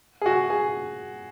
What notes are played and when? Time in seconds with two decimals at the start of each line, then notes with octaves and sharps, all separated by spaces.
0.21 G#4
0.26 F#4
0.50 G#4